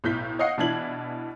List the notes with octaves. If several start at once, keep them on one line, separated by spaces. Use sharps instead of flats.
B1 A2 G6 B6
C#5 D#5 F5 F#5 C7 C#7
B2 E3 D4 E4 G#6 F#7